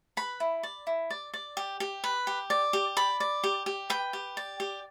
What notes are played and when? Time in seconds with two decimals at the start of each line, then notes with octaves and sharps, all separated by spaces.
0.17 B4 B5
0.40 E4
0.63 D5
0.87 E4
1.10 D5
1.34 D5
1.57 G4
1.80 G4
2.04 B4
2.27 G4
2.50 D5
2.73 G4
2.97 D5 B5
3.20 D5
3.44 G4
3.66 G4
3.90 B4 G5
4.13 G4
4.37 D5
4.60 G4